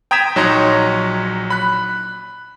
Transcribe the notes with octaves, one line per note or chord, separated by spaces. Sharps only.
G5 A#5 D#6 G#6 B6 E7
A#1 F#3 D#4 C#5 A#5 C6
B5 F#6